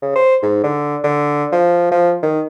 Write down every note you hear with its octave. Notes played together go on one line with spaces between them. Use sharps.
C#3
C5
G#2
D3
D3
F3
F3
D#3